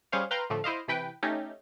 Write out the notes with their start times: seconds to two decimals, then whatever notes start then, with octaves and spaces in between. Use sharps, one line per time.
0.12 G3 C#4 G#4 C5 C#5 F5
0.31 B4 F5 G5 A#5 C6
0.50 A2 D3 F3 A3
0.64 E4 C5 D#5 F5
0.88 C3 E3 B4 G5
1.23 A3 C#4 D#4 G4